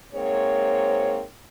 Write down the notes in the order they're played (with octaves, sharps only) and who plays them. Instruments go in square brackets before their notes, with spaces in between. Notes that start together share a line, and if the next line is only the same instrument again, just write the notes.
[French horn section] G#2 A#3 C4 C#5